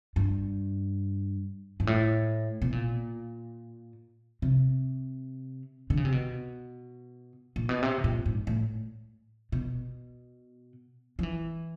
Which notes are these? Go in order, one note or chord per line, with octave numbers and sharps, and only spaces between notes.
G2
G#2
A2
B2
A#2
C3
D3
C#3
C3
B2
A#2
B2
C3
A#2
G#2
A2
B2
F3
E3